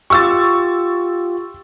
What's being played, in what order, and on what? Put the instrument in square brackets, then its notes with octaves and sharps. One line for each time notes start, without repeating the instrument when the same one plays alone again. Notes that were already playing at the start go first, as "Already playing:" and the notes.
[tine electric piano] F4 G4 [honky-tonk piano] C#6 E6 A6